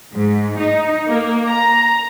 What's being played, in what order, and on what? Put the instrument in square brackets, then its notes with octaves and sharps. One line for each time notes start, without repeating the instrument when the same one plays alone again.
[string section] G#2
D#4
A#3
A#5